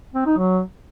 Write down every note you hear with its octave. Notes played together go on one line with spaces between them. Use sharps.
C4
D#4
F#3